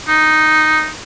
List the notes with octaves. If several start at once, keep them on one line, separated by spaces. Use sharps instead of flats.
D#4